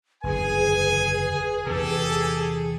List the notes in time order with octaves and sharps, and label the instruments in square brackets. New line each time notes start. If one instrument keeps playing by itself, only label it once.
[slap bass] F#1 E2 D3 [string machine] G#4 [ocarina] B4 [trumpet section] G#5
[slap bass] E2 C3 [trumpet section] G4 A4